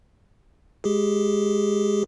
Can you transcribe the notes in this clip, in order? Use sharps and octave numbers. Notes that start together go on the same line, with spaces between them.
G#3 G4 G#4